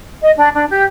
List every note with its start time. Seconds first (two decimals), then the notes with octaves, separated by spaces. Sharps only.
0.22 D#5
0.36 D4
0.55 D4
0.69 G4